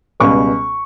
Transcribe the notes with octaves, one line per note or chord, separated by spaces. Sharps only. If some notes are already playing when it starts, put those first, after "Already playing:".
C#2 B2 G3 C#6